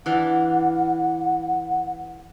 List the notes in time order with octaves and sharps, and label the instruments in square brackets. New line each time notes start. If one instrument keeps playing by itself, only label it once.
[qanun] E3 D4 F5 [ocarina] F#5